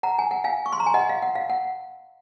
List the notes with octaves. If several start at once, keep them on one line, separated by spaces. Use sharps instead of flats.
F#5 A#5
G#5
F#5
F5 G#5
C#6
C6
A#5
G#5
D#5 F#5
F5
F#5
F5
F#5